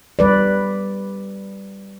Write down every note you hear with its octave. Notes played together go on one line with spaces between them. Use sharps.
G3 B4 D5